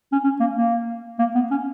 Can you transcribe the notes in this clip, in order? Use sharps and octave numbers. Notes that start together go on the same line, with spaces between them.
C#4
C#4
A#3
A#3
A#3
B3
C#4